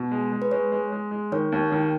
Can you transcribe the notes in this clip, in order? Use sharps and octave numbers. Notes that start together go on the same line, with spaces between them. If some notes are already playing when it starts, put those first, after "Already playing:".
Already playing: B2
G#3
G#3
B4
G#3 C#5
G#3
G#3
G#3
D#3 C#5
D#2
D#3